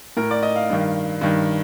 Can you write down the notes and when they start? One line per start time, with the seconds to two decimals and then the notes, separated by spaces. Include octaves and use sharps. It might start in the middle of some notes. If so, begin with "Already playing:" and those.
0.17 A2 A#4
0.31 D5
0.43 D#5
0.56 F5
0.70 G2 D#3
1.21 G2 D#3